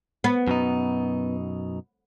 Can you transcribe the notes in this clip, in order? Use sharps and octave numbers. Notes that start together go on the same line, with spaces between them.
B3
F#2 B2 D#4